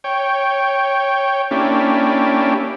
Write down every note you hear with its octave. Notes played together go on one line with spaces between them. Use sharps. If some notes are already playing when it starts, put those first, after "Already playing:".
C#5 G5
A#3 C#4 D4 E4 G4